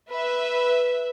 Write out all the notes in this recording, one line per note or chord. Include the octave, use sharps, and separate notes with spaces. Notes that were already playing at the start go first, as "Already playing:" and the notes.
B4 E5